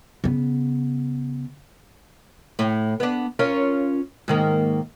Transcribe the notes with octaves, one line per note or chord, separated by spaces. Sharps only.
C#3 B3
A2
B3 D4
C#4 F4 A#4
G#2 D#3 A#3